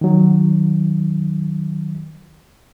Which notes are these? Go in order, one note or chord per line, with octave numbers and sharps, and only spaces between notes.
D#3 F#3